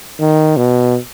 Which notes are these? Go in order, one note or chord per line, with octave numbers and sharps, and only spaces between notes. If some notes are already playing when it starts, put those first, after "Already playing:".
D#3
B2